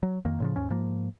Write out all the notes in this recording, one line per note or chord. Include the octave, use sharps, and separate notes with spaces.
F#3
F2 D#3 A#3
A2 C#3 F3
D#2 G#2 C#4
G#2 F3 A#3